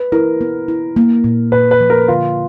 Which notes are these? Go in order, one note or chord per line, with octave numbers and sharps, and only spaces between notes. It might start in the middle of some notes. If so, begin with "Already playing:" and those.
Already playing: B4
E4 A#4
B3
E4
A#3
A#2
A#2 B4
B4
F3
A#4
D3 F4